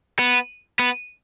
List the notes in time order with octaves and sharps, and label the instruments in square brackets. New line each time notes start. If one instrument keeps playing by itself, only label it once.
[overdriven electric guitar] B3
B3